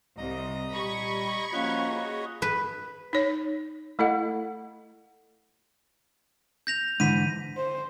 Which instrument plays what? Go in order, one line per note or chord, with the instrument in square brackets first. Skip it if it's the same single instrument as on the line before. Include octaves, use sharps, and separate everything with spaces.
[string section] C2 [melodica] D#5 A#5 D#6
[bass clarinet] A#2 [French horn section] G3 [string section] B5 C#6 G#6
[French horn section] F3 C#4 F4 [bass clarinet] A#3 [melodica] F#4 C#5 D#5
[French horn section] G#4
[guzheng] B4
[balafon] D#4 C#5
A3 E4 A4 D#5 F#5
[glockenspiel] G6 A#6 F7
[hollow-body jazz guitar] G#2 D3 E3 [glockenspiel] B6 D#7
[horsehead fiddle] C5